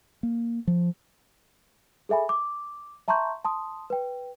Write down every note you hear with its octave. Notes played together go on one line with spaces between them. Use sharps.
A#3
F3
G#4 A4 E5 G#5 B5
D6
E5 A5 A#5 C6 C#6 G6
A5 C6 D#6
B4 G5